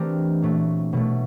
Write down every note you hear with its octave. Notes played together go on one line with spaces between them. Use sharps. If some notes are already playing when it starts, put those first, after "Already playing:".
Already playing: E3 A3 C4 D4 E4 G4 A#4
A#2 F#3 A3
B2 F#3 A3